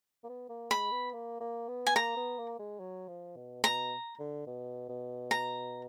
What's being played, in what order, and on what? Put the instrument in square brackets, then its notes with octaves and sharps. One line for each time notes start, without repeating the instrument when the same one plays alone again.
[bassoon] A#3
B3
A#3
[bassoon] G#3 [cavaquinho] B5
[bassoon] B3
A#3
A#3
B3
[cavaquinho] G#5
[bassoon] A#3 [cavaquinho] A#5
[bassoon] B3
A#3
G#3
F#3
F3
B2
[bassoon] B2 [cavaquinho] A#5
[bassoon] D3
B2
B2
[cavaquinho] A#5